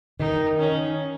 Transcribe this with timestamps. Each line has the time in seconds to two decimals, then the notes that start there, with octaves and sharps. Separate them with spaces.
0.20 D#3 D#4
0.59 C#4